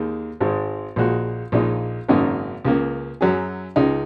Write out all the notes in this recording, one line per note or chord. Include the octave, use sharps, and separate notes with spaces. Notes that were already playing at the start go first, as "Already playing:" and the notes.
Already playing: D#2 D#3 G#3
G#1 G#2 G#3
A#1 A#2 G#3 F#4
A#1 A#2 G#3 D#4
G#1 F#2 C#3 A#3 D#4
C#2 C#3 A#3
F#2 F#3 C#4 G#4
C#2 C#3 G#3 D#4